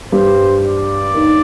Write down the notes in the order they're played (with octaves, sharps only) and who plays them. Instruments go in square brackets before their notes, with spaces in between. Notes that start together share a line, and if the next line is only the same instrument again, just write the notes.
[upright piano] G2 G3 [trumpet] C5
[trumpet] D5
[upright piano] D#2 D#3